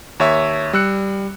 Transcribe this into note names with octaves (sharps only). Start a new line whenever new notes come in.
D#2 C#5 E5
G3 E6 F#6 C#7